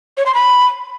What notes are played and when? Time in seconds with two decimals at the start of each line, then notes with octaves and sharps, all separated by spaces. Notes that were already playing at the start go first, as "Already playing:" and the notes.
0.17 C#5
0.26 C6
0.34 B5